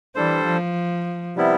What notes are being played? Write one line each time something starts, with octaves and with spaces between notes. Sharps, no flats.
E3 G3 D4 A4 C5
F3
C3 G3 B3 E4